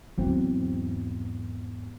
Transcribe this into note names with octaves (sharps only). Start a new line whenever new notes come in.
E2 G#2 E3 F#3 C4